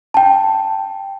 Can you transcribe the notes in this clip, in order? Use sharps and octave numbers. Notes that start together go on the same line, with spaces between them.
G5 A5